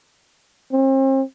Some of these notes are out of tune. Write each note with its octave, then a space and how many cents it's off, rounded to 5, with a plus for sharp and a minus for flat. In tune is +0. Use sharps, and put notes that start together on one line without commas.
C4 +40